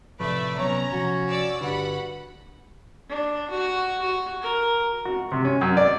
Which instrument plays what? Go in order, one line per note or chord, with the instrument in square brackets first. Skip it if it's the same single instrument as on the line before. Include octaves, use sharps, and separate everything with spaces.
[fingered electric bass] A2 C3 F3 [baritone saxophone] A3 [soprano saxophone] B4 [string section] D5 E5
[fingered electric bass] C3 F#3 B3 [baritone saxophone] C#4 [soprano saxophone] C#5 [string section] A#5
[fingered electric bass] C3 F3 [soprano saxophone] F#4
[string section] D5 E6
[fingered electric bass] G1 D3 [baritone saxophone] G2 [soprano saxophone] F#4 [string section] F#5 B5
[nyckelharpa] D4
F#4
F#4
A#4
[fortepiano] F#4
C3
C#4
F#2
D5